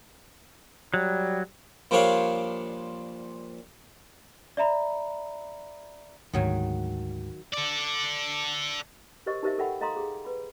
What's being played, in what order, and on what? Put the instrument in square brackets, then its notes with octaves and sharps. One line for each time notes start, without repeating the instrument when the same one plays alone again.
[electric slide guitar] F#3 [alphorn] G3
[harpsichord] A#2 F3 G3 D4 C#5 F5
[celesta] D5 E5 A#5 B5
[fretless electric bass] D2 G#2 [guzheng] D#3 F#3 G#5
[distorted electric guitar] A4 D5
[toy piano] G4 A#4 C5 D#5 C#6
D#4 G4 A#4 C5 D#5 E5
A4 A#4 E5 F#5 G5 B5
A4 D#5 F5 A#5 C6 D#6
G#4
B4 B5